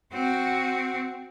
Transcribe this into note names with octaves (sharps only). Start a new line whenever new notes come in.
C4 F#4